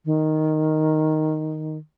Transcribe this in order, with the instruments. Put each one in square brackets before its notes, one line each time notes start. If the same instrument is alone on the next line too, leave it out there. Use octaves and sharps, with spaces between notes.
[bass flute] D#3